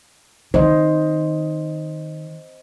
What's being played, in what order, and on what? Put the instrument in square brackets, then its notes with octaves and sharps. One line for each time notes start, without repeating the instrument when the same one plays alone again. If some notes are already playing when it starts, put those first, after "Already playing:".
[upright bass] D#3 [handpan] C5 D#5